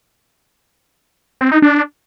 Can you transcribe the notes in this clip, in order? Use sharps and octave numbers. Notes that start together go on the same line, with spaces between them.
C4
D#4
D4